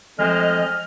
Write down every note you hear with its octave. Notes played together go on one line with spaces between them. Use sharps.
F3 G#3 A3 C4 D#5 F6